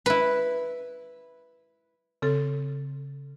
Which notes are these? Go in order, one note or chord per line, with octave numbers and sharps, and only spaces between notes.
E4 B4
C#3 C4 A4